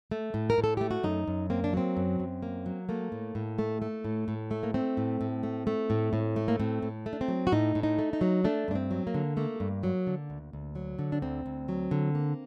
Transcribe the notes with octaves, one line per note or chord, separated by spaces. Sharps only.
A3
A2
A#4
A2
A4
A3 G4
F#4
F#2 D#4
F#2
A#3 C4
D4
F#3 C4
F#2
F#2
A#3
F#3
A3 A#3
A2
A2
A3
A3
A2
A2
A3
A#3
A3 C4
A2
A2
A3
A3
A2
A2
A3
A#3
A2 C4
A2
A3
D4
C4
F#3
F#4
A2 D#4
A2
D#4
A3
D#4
F#3
A3 D4
G2 D4
C4
F#3
A#3
D3
A3 A#3
G2
F#3
D3
D2
D2
F#3
D3
D4
D2 C4
D2
F#3
D3
A#3